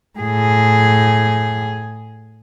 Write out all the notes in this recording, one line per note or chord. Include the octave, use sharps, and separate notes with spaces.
A2 G#4